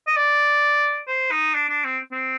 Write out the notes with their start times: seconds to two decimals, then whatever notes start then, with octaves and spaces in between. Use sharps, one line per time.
0.07 D#5
0.17 D5
1.08 C5
1.31 D#4
1.54 D4
1.69 D4
1.84 C4
2.12 C4